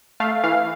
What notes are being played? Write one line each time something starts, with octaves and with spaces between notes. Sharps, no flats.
A3 F5
E3 F5